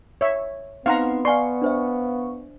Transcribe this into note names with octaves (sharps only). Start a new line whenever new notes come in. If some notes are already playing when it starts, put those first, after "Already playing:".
C#5 E5
B3 C4 D#4 F5 F#5 A#5 C6
D5 F5 G#5 C6 C#6
D4 C5 E5